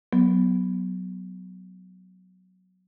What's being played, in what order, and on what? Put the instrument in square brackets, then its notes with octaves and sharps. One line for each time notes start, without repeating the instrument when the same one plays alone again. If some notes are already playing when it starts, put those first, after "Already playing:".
[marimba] F#3 B3